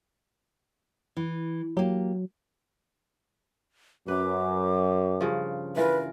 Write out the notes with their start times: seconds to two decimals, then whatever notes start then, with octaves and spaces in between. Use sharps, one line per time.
1.17 E3
1.77 F#3 A#3 G4
4.08 F#2 B4 D6
5.21 G2 C#3 F3
5.77 E3 F4 A#4 B4